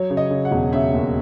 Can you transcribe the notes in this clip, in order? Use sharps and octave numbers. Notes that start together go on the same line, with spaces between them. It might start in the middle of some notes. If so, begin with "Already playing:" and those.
Already playing: F#3 C#5
C#3
D#5
C#3
F#5
E1
C#3 E5
D#2